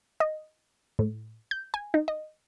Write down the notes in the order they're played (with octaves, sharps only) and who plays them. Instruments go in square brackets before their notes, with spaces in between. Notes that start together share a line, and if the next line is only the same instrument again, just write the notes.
[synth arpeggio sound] D#5
A2
G6
G#5
D#4
D#5